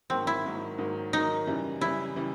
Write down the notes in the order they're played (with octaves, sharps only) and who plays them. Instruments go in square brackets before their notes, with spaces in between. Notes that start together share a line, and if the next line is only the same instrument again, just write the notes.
[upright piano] G#2 D#3 F#3 A#3 [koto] C4
[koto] E4
[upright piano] G#2 D#3 F#3 A#3
G#2 D#3 F#3 A#3
[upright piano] G#2 D#3 F#3 A#3 [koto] D#4
[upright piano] F#2 C#3 E3 G3
[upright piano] F#2 C#3 E3 G3 [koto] E4
[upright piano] C#3 E3 G3